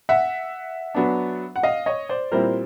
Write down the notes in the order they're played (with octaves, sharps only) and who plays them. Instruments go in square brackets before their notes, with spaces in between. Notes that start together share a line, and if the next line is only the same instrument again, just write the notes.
[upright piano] E5 F#5
F#3 B3 D4
F#5
D#5 F5
C#5 D#5
C5 D5
A#2 G3 C4 E4 A#4 C5